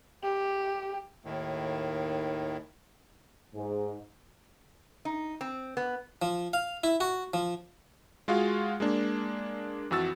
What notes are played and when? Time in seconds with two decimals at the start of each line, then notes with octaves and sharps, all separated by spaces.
0.23 G4
1.25 D#2 A2 D#3
3.55 G#2
5.05 D#4
5.41 C4
5.77 B3
6.22 F3
6.53 F5
6.84 E4
7.01 F#4
7.34 F3
8.28 G#3 F4 F#4 G#4 F5
8.80 G#3 A#3 D4
9.91 F2 E3 F#4 E6 A6